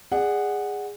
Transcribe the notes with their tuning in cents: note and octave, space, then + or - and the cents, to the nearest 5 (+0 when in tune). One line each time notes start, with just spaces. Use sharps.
G#4 -15 D5 +20 F#5 +0